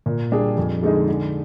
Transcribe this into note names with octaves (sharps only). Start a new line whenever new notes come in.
A#2
G3 D4 G#4
F2
D3 G#3 D#4 G#4
D3